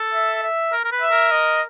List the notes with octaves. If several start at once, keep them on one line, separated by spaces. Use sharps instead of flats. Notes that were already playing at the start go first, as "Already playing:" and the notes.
Already playing: A4
E5
E5
A#4
A#4
B4
E5
A#4
D#5